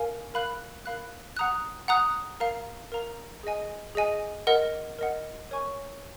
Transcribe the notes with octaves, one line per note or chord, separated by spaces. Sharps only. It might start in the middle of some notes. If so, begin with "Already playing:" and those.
Already playing: A#4 F5 G#5
A#4 F5 B5 F#6
A#4 F5 B5 F#6
F#5 A#5 D#6 F#6
F#5 A#5 D#6 F#6
A#4 F5 A#5
A#4 F5 A#5
G#4 D#5 G#5
G#4 D#5 G#5
A#4 D#5 F#5
A#4 D#5 F#5
A#4 C#5 G#5 C#6